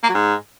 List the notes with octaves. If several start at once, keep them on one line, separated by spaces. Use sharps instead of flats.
A#3
F#3
G#2